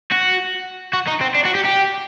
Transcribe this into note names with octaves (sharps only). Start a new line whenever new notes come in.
F#4
F#4
D#4
C4
D4
F#4
G4
G4